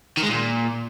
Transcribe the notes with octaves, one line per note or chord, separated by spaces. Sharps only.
D#3
G#3
A#2